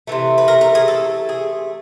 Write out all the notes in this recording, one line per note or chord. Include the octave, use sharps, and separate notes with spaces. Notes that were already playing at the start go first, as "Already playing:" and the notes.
C3 E3 A3
B4
A#4
A#4
G#4
A4
G#4